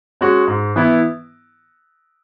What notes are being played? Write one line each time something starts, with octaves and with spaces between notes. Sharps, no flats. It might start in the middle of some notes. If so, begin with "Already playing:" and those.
G#3 C#4 F#4
G#2
E3 B3 E4